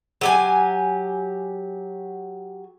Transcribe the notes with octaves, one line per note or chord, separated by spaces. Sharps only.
F#3 G4 G#5